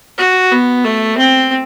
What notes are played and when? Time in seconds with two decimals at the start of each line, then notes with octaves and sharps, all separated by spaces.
0.18 F#4
0.51 B3
0.84 A3
1.18 C4